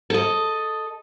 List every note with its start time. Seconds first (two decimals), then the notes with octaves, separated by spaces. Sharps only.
0.10 A4 D#5